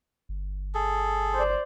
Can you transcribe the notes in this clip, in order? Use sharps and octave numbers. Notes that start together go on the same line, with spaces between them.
G1
G#4 A4
C5 D5